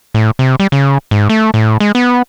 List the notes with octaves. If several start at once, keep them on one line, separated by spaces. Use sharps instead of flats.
A2
C3
G3
C#3
G#2
A3
A2
G#3
B3